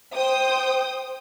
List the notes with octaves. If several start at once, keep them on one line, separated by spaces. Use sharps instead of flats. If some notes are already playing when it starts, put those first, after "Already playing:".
C5 G5 D#6